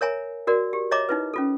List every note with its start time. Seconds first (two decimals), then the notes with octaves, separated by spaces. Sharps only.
0.01 A#4 C#5 E5 G#5 A#5
0.47 F#4 A#4 D5
0.73 G4
0.91 C#5 D#5 E5 A#5 D6
1.09 D#4 E4 B4
1.34 C#4 F4 A4